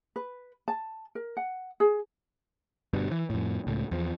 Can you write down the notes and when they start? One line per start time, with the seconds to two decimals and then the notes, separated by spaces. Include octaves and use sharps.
0.16 B4
0.68 A5
1.15 A#4
1.37 F#5
1.80 G#4
2.93 G1 G2 B2 D4
3.11 E3
3.30 F2 A2
3.67 C#2 A2
3.91 E2 F3